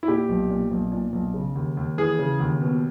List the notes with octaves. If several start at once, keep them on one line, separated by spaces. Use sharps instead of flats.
E4
A#2 G4
B1
A#2
B1
A#2
B1
C#3
D#2
D#2
E3 G#4
C#3
D#2
B2